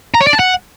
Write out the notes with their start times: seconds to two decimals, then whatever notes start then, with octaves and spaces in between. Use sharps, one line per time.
0.14 A#5
0.21 C#5
0.27 D5
0.33 A5
0.39 F#5